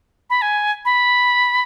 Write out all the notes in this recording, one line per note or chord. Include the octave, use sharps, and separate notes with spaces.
B5
G#5
B5